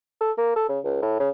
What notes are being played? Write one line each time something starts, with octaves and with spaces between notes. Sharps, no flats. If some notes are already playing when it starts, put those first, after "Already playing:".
A4
A#3
A4
C#3
C#2
A2
C#3